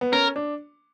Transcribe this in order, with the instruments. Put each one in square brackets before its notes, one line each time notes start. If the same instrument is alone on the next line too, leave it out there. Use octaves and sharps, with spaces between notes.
[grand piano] B3
[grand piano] C#4 [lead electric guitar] A#4
[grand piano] D4